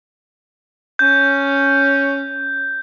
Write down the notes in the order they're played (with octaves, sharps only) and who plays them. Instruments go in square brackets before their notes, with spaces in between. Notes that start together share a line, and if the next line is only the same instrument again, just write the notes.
[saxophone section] C#4 [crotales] G6